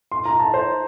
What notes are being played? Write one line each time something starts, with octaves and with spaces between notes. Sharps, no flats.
C6
A#5
A5
C5